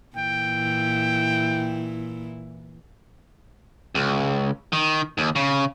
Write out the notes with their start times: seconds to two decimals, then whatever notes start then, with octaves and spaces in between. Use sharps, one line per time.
0.17 A#2 E3 E4 G5
3.95 C#2
4.73 D#3
5.18 D#2
5.36 C#3